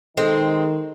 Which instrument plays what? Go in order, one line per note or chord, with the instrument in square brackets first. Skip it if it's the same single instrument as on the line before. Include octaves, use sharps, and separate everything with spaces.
[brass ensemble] D#3 [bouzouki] G#3 C4 [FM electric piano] A4